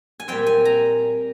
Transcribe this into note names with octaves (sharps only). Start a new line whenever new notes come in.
G#5
A#2 G3 C4 G5
G#5
A#5